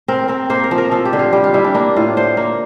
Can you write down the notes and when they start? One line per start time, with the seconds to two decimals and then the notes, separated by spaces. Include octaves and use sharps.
0.08 C4 A#4
0.28 C4 A#4
0.50 A#3 C5
0.64 A#4
0.71 F3
0.78 A#4
0.91 F3 A4
1.05 G4
1.13 D3
1.19 F4
1.33 G3 G4
1.44 F4
1.54 G3 E4
1.64 D4
1.74 A#3 D4
1.96 A2 F4
2.17 D3 C5
2.37 A#3